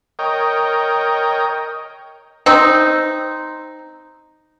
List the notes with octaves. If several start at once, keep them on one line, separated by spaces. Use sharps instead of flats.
A#4 C#5 D#5 G5
C4 D#4